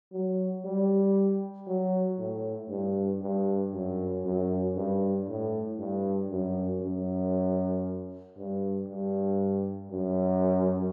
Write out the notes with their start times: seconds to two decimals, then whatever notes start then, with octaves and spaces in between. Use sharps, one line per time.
0.12 F#3
0.65 G3
1.67 F#3
2.18 A2
2.69 G2
3.21 G2
3.73 F#2
4.24 F#2
4.76 G2
5.28 A2
5.79 G2
6.31 F#2
6.82 F#2
8.37 G2
8.88 G2
9.91 F#2